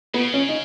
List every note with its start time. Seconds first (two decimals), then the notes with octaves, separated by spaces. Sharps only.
0.14 C#3 B3
0.34 C#4
0.49 D#4